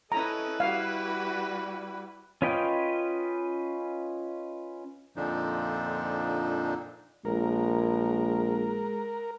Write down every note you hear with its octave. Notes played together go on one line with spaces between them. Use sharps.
C#4 E4 A4 B4 D#5 A#5
G3 F#4 G4 F5
C#4 F4 B4 D#5 G5
F2 A#2 D3 F3 D4 D#4
A#1 G#3 A#4